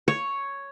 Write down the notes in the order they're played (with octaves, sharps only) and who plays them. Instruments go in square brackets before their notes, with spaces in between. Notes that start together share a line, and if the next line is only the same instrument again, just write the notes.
[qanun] C#5